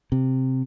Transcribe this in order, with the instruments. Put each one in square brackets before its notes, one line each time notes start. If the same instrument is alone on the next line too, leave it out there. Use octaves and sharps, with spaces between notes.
[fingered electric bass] C3